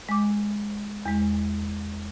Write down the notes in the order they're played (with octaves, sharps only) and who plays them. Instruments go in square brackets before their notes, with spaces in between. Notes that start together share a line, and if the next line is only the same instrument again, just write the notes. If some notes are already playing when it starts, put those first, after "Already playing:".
[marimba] G#3 D6
E2 G#3